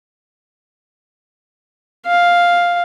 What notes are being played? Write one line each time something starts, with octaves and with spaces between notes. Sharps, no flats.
F5